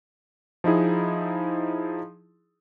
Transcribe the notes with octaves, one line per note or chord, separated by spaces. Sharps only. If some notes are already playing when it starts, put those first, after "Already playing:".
F3 D#4 E4 G#4